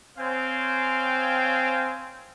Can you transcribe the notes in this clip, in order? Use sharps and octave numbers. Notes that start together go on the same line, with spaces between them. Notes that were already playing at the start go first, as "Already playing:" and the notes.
C4 C5 C#5 F5 G5 G#5